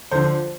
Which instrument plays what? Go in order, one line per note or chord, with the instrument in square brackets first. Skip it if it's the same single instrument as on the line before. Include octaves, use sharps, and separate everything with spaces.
[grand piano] D3 F3 C5